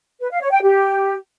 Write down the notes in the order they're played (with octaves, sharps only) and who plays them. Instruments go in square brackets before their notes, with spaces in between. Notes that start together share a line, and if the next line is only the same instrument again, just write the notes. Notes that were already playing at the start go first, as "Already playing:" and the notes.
[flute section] B4
F5
C#5
G5
G4